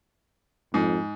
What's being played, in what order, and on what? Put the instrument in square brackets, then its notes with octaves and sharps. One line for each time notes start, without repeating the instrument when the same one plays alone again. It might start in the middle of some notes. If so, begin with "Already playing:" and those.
[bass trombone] F2 [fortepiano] G#2